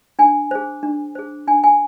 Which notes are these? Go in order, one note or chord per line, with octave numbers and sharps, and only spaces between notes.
D4 G#5
G#4 C5
D4
G#4 C5
D4 G#5
G#5